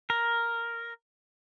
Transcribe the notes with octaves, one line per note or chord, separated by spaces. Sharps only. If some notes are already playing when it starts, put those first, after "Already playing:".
A#4